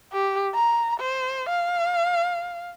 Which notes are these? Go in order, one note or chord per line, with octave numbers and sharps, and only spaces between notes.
G4
A#5
C5
F5